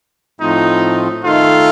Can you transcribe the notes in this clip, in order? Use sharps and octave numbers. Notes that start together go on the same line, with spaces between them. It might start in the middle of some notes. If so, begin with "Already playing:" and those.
A2 F3 A3 C4 D#4 F4
D#3 A3 D#4 F4 A4